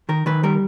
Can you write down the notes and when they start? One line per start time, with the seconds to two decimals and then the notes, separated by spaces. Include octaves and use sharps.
0.09 D#3 A#4
0.26 D#3 B4
0.43 G3 A#4